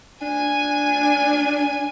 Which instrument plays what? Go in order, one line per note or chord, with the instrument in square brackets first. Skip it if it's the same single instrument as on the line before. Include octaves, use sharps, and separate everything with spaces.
[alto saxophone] D4 [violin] G#5